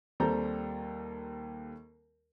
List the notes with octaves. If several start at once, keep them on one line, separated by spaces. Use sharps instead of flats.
D#2 G3 C4 A4 A#5 G6